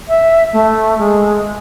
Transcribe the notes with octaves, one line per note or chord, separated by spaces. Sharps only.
E5
A3
G#3